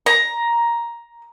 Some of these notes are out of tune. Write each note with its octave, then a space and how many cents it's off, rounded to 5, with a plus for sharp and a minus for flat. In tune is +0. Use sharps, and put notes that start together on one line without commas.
A#5 +10